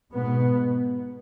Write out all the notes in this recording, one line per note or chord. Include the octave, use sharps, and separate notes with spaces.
G#2 B2 B3